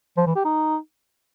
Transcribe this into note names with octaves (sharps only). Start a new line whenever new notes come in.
F3
E3
G4
D#4